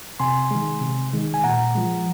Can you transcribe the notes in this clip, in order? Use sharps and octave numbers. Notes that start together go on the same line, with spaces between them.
C3 G#5 C6
D#3 G#3
C3
D#3 G#3
G#5
A#2 F#5 A#5
F3 G#3